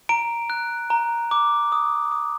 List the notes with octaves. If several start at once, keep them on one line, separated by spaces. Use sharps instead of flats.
A#5 D7
F#6
A#5
D6
D#6
D#6